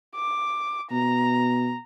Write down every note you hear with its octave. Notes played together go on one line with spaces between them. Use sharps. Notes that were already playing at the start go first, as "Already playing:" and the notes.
D6
B2 A#5